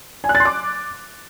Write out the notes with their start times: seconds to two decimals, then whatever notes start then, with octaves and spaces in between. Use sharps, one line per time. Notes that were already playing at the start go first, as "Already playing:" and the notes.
0.24 G#5
0.29 F#6
0.35 A6
0.40 C6
0.45 D6